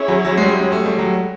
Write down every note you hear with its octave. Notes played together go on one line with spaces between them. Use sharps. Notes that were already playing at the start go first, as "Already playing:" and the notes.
Already playing: C#4 E4 G#4 C#5
F#3
F#3
G#3
G3
G#3
A3
G3
F#3